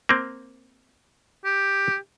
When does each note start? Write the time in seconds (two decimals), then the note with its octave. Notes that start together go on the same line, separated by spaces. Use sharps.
0.09 A#3 C4
1.45 G4